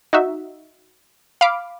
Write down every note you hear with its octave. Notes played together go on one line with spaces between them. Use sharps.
D#4 F#4 E5
F5 B5 D6